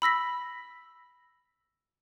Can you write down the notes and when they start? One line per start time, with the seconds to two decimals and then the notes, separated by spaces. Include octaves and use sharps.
0.02 B5 E6 A#6 B6